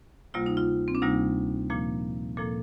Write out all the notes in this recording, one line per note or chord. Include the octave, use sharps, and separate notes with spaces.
D2 C3 G3 A#3 F4
D#4
F4
C4
D4
D2 C3 G3 A#3 D#4
A#2 F3 A#3
A#2 F3 A#3 A4